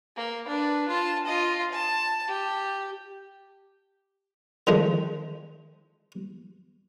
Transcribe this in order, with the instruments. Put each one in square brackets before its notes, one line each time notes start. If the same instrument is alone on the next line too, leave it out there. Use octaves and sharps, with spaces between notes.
[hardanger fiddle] A#3
D4 B4
F4 A5
F4 D#5
A5
G4
[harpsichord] D3 D#3 F3 G#3 A3